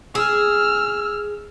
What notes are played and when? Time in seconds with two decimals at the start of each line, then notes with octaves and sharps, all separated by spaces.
0.15 G#4 E6 F6